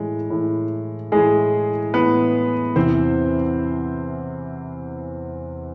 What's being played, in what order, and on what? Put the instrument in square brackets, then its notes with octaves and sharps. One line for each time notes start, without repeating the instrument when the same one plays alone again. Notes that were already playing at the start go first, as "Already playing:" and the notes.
Already playing: [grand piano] A2 E3 G#3
A2 E3
A2 E3 G#3 G#4
A2 E3 B3 B4
E2 C3 E3 C4 C5